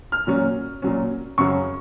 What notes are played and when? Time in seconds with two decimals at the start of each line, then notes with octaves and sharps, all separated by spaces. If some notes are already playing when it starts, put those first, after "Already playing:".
0.12 F6
0.27 A#2 F#3 C#4
0.82 A#2 F#3 C#4
1.38 F#2 C#3 F#3 C#4 C#6